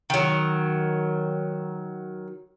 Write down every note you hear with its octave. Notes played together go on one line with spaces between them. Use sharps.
D#3 F#3